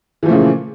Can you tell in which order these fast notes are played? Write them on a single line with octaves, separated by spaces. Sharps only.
E3 F3 A3 C#3 A#2